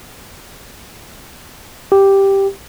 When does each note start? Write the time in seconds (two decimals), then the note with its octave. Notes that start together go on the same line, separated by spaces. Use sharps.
1.92 G4